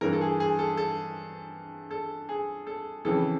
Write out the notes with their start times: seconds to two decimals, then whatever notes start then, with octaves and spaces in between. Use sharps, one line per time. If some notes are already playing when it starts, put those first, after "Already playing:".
0.01 G2 E3 A#4
0.13 A4
0.21 G#4
0.40 G#4
0.59 A4
0.77 A4
1.91 A4
2.29 G#4
2.67 A4
3.05 F2 C#3 E3 A4